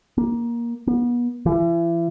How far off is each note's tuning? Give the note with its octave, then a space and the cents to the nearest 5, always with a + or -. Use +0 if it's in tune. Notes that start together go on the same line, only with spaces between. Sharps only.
A#3 +15
B3 -35
E3 +35